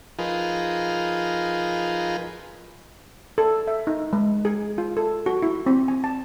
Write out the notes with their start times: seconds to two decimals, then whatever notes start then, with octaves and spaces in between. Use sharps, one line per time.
0.19 F3 D#4 F4 G#4 A#4 B4
3.38 A4
3.68 E5
3.87 D#4
4.13 G#3
4.45 G#4
4.78 F4
4.97 A4
5.26 F#4
5.43 E4
5.66 C4
5.88 G#5
6.04 A5